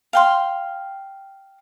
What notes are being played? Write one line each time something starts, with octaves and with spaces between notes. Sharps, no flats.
F5 G5 C6